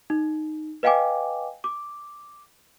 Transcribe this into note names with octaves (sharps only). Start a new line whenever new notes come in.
D#4
B4 D#5 F5 G5 G#5 D6
D6